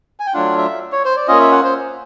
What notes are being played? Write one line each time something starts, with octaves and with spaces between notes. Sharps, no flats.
G#5
G5
F#3 A3 D4 F4 F#5
E5
C#5
C5
D5
A#3 C#4 F4 D#5
E5
F#5
C5